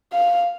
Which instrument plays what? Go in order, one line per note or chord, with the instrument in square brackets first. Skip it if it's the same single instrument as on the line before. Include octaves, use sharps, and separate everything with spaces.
[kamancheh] F5